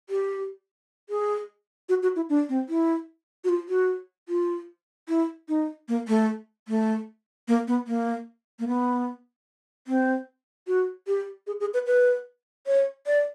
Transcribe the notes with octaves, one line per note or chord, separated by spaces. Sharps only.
G4
G#4
F#4
F#4
E4
D4
C4
E4
F#4
F4
F#4
F4
E4
D#4
A#3
A3
A3
A#3
B3
A#3
A#3
B3
C4
F#4
G4
G#4
G#4
B4
B4
C#5
D5